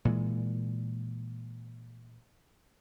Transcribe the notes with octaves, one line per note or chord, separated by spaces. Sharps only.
A#2 E3 G#3